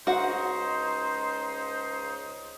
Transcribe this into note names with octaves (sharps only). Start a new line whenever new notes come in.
C#2 D#4 F#4 C5 F#5